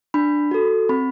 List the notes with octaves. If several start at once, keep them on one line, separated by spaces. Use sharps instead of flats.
D4 B5
F#4 A4
C4 B5